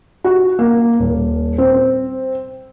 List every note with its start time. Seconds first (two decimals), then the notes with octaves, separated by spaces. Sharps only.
0.24 F#4
0.59 A#3
0.99 D#1
1.58 C4